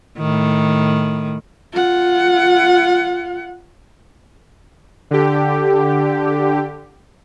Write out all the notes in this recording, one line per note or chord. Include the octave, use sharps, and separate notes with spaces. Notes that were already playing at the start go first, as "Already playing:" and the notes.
A2 D#3
F4 F#5
D3 G4